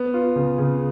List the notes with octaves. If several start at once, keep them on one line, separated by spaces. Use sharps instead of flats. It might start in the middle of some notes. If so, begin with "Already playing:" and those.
Already playing: B3
F4
C#3
C#3